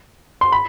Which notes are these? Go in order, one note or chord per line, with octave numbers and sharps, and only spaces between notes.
C6
B5